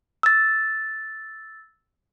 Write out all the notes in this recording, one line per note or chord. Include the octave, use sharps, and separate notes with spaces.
E6 A6